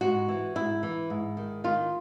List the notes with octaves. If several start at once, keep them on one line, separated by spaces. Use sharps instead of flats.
G#2 F#4
E3
G#2 E4
E3
G#2
D#3
D#3 F4